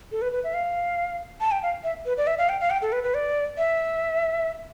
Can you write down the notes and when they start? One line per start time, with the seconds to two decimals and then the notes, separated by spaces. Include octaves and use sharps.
0.12 A4
0.22 B4
0.32 B4
0.44 E5
0.54 F5
1.41 A5
1.51 G5
1.63 F5
1.84 E5
2.06 B4
2.17 D5
2.27 E5
2.38 F5
2.49 G5
2.61 F5
2.70 G5
2.82 A4
2.92 B4
3.03 B4
3.14 D5
3.58 E5